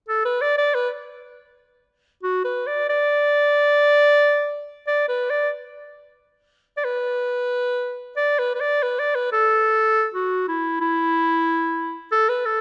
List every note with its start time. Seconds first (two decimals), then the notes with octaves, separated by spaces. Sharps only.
0.09 A4
0.25 B4
0.42 D5
0.58 D5
0.75 B4
2.23 F#4
2.45 B4
2.67 D5
2.89 D5
4.87 D5
5.09 B4
5.30 D5
6.77 D5
6.85 B4
8.17 D5
8.39 B4
8.55 B4
8.61 D5
8.83 B4
8.99 D5
9.15 B4
9.32 A4
10.14 F#4
10.48 E4
10.81 E4
12.12 A4
12.29 B4
12.45 A4